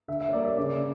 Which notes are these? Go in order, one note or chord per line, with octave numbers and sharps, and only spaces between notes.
D3 E5
E5
C#5
G3 A#3 D5
E5
C#3 D5